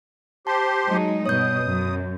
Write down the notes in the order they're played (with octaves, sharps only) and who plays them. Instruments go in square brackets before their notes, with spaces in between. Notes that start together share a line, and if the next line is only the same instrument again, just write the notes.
[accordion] G4 C5 C6 [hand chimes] A5
[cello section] F#3 G#3 D#4
[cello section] G2 B2 [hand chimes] C#5 G6 [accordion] D#6
[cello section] F#2